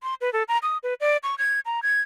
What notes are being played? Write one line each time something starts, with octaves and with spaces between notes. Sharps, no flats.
C6
B4
A4
A#5
D#6
B4
D5
C#6
G#6
A#5
G#6